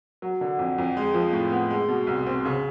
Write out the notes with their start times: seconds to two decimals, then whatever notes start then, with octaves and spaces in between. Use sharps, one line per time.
0.22 F#3
0.41 D3
0.59 F2
0.78 F2
0.97 G#3
1.14 F3
1.33 A2
1.51 B3
1.70 G#3
1.88 B2
2.07 C2
2.27 C4
2.45 C#3